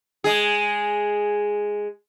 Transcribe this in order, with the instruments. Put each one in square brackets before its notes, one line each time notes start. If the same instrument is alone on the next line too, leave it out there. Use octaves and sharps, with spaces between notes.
[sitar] G#3 G#4